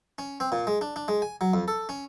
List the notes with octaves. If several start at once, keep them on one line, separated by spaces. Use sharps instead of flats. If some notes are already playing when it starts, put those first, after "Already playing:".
C#4
C4
A#2
G#3
D4
D4
G#3
G#5
F#3
F2
A4
C#4